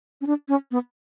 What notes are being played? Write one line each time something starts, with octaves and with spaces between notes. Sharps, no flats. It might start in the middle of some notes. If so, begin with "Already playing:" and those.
C#4
D4
C#4
B3